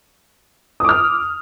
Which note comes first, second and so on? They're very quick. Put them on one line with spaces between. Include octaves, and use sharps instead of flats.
D#6 D6 F6